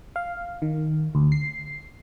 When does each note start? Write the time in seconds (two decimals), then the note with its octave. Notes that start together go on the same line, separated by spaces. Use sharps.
0.16 F5
0.62 D#3
1.15 D2
1.32 C7